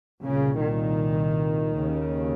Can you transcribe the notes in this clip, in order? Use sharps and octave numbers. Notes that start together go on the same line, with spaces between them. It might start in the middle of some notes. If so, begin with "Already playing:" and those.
C2 A#2 C#3
D#3
D#2 C#3